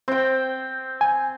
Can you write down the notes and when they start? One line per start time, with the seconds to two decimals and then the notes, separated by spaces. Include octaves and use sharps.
0.08 C4 G5
1.01 G#5